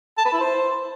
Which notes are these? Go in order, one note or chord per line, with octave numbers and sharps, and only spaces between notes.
A5
B4
E4
C5